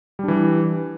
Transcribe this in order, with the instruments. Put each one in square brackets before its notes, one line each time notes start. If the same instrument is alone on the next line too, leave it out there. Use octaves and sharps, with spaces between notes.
[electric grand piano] G3
D4
E3